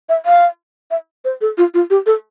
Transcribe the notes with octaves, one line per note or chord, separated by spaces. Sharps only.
E5
F5
E5
C5
A4
F4
F4
G4
A4